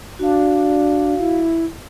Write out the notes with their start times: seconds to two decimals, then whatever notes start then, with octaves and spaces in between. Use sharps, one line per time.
0.19 D4 F#4 F5
1.19 E4